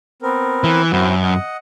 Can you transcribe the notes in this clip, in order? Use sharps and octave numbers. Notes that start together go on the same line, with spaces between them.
B3 C4 A#4
E3
F#2 C4 E4 F#4
D#5 F#5